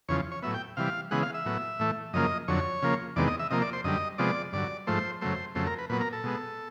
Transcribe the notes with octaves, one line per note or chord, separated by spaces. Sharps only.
E2 C#3 F3 C#5
C#5
A2 F#3 B3 E5
G5
C3 E3 G3 F5
C#3 E3 G#3 B3 F#5
F5
E5
A2 F#3 B3
A2 E3 A3
F#2 C#3 F3 A#3 D#5
F2 D3 F#3 C#5
C#3 F3 A#3
E2 C3 D#3 G#3 B3 D5
D#5
E5
C3 F3 A#3 D#5
D5
C5
F#2 D3 G3 D#5
C3 F3 G#3 B3 D5
G2 D3 F#3 D5
G#2 F3 A3 C5
F#2 C#3 F#3 A3 C5
F2 C#3 F#3 A3 C5
A#4
B4
A#2 F#3 B3 B4
A#4
A4
B2 G#3 B3